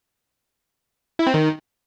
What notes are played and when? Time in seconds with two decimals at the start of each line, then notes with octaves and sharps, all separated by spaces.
1.19 E4
1.27 C4
1.34 D#3